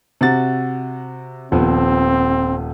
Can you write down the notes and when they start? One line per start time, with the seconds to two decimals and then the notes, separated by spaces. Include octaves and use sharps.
0.21 C3 F#4 A6
1.52 D#1 F3 B3 C4